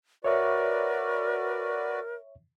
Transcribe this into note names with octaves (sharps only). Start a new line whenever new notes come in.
F#4 A#4 B4 C#5 D5 E5 C#6